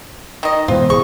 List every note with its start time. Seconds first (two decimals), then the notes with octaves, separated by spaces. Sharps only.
0.43 D#3 D#5
0.68 G#2 B2 E3 F4 C5
0.90 C#2 G#4 C#6